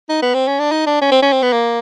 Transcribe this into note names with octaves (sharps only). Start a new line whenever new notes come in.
D#4
B3
C4
C#4
D4
D#4
D4
C#4
C4
C#4
C4
B3
A#3